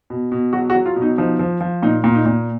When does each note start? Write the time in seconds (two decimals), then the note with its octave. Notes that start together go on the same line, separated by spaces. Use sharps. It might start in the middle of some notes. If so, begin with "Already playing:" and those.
0.10 B2
0.32 B2
0.53 F#3 F#4
0.70 F#4
0.75 F#3
0.86 F4
0.96 B2
1.02 D#4
1.18 F3 D#4
1.39 F3
1.61 F3
1.83 A#2 D#4
2.04 A#2
2.15 D#4
2.26 A#2